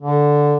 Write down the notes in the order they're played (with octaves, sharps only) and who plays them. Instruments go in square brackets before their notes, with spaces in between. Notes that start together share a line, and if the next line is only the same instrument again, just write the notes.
[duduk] D3